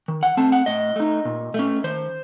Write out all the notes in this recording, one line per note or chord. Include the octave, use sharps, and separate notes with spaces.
D#3
F#5
A3 C4 A5
F#5
A2 D#5
A3 D#4
A#2
A3 C#4
D#3 C5